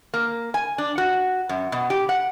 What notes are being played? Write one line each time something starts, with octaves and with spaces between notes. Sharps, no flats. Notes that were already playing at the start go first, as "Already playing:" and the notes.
A#3
G#5
D4
F#4
F#2
B2
G4
F#5